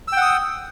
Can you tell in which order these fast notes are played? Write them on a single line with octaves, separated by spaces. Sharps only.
E6 G5 F#5 D#6